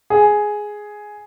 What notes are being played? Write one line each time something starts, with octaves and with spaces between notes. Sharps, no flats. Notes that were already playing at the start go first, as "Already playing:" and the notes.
G#4